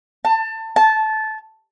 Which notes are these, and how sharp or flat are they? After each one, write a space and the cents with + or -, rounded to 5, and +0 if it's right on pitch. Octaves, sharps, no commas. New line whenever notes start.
A5 +25
A5 -15